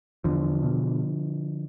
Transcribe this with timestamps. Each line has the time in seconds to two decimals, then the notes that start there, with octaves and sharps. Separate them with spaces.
0.24 E2 D3 F3
0.63 B2